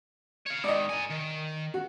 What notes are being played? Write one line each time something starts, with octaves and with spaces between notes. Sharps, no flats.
C#5 F5
G#2 D#3 D5 D#5
A#4 G#5
D#3
F#4